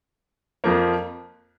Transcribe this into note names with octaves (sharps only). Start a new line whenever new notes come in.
F2 F3 A#3